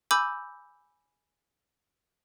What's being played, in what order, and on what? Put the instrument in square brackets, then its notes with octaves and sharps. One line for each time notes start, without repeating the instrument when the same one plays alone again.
[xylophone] G#5 B5 D6 E6 G6